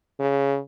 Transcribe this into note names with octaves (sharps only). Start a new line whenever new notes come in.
C#3